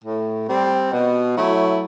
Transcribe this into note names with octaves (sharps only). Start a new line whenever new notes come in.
A2
G3 C4
B2
F#3 A3 E4